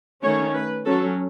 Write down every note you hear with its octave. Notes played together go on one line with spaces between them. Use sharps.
D#3 A3 C#4 C#5
B4
F#3 C#4 A4